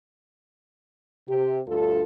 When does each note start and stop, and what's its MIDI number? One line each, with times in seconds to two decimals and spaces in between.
1.27 1.60 48
1.27 1.60 67
1.66 2.03 38
1.66 2.03 43
1.66 2.03 65
1.66 2.03 69